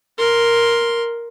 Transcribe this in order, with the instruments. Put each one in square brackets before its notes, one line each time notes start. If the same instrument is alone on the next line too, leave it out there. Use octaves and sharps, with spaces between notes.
[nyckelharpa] A#4 C6